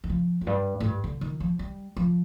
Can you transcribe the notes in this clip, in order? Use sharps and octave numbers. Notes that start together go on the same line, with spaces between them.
D#3
F3
F2
G2
A2
G2
D3
D#3
F3
G3
F3